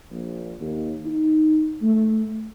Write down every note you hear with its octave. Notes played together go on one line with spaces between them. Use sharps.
A#1
D#2
D#4
A3